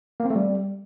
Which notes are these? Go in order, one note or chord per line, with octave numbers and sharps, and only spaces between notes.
A#3
C4
A3
G3